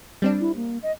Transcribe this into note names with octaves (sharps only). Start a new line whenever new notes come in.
G3 C4 D4
E4
A#3
D#5